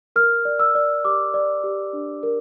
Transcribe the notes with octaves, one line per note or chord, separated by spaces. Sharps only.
A#4 F6
D5
E6
D5
G4 D6
D5
G4
D4
A#4